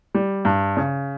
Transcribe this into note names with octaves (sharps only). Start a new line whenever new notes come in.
G3
G2
C#3